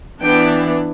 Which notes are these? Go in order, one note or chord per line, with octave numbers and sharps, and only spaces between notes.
E3 B3 D4 G5